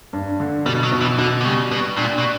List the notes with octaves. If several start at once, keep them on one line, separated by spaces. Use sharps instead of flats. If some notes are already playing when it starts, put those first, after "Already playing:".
G2
D3
B2 G3
F#3
B2
E3
B2 D3
D3
C#3 G3
B2 B3
A#2 D4
B2